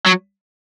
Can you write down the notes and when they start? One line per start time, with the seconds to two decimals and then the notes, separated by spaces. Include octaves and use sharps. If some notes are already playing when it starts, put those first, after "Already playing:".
0.07 F#3